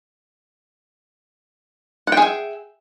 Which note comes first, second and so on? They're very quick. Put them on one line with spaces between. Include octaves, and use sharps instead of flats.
F#5 G5 G#4 E5